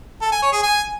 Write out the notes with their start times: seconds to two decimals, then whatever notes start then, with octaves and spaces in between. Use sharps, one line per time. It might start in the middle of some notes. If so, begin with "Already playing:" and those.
0.22 A4
0.32 G#5
0.42 C#5
0.53 G#4
0.63 G#5